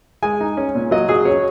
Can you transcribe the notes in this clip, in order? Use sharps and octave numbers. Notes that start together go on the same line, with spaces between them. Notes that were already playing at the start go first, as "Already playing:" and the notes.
G#3 G#5
D#4
C#4
A#2
F#3 D#5
F#3 G#4
C#4 C#5